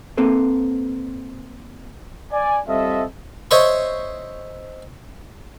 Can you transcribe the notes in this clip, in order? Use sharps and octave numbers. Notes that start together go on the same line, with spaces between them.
A#3 C4 A4 B4
D5 G#5
G3 C4 F4 A4 D#5 E5
C5 C#5 D#5 E5 C6 C#6